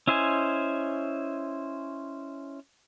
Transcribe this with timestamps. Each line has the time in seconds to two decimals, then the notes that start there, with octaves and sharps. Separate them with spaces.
0.07 C#4 E4 C5 D#5 G#5